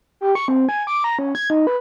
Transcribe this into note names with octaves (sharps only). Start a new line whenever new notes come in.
G4
C#6
C4
G#5
D6
A#5
C#4
G#6
D#4
B4